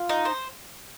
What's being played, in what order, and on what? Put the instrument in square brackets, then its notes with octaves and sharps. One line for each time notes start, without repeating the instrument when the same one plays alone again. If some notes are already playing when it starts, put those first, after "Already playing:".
Already playing: [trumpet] F4
[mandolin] D#4
C5